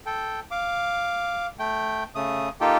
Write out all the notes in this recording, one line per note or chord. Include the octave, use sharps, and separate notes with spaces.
A4 G5
F5 D6
A3 G5
C#3 A3 D#6
A#3 D#4 F4 G4 A4 G5